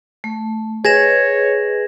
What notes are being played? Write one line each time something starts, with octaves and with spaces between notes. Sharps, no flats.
A3
G#4 B4 C#5 D#5 G#6 A#6 E7